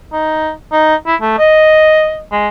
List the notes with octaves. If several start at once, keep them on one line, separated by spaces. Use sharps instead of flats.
D#4
D#4
E4
A3
D#5
G#3